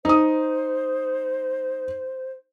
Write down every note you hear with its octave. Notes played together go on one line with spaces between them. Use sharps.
D#4 C5 D#6